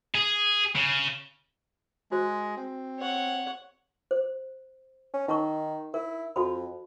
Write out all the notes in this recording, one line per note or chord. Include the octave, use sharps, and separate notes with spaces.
G#4
C#3
G#3 F#4 C5
C4
C#5 F#5
C5
C#4
D#3 D#4 A#4 C#6
E4 A#4
F2 F#4 A4 B5